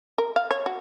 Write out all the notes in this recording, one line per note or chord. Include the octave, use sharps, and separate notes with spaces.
A#4
F5
C#5
F#4